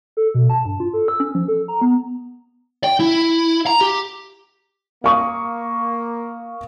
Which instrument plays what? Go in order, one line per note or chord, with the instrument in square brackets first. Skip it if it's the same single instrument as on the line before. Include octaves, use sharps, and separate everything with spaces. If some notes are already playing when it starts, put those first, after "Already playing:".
[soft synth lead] A4
B2
A5
G2
F4
A4
E6
C#4
F3
A4
A#5
B3
[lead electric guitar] G5
E4
A#5
G4
[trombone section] A#3 [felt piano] F5 C#6 D#6